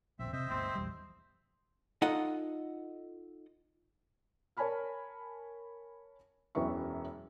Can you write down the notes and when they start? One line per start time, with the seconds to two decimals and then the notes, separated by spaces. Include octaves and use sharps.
0.19 E1 A#1 C4 E5
0.33 C3 C4 C5 D#5 E5
0.49 G1 D2 B2 C4
0.75 A#1 E2 G3
2.02 D#4 F4 A4 D#5 F#5
4.57 A#4 C#5 G#5 A5 B5 F6
6.55 E1 F#2 E3 B3 E5 C#6